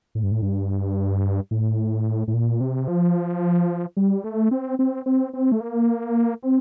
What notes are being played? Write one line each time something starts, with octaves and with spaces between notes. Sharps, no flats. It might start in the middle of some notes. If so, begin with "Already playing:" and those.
A2
G2
A2
G2
A2
A2
A#2
C3
F3
G3
A3
C4
C4
C4
C4
A3
A#3
C4